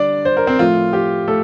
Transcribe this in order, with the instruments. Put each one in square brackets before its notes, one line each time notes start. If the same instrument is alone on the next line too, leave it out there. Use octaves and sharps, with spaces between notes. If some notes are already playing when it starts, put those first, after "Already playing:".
Already playing: [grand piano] D3 G3 D4 D5
C5
A#4
C4 C5
A2 F3 A3 F4
G4
A3 A4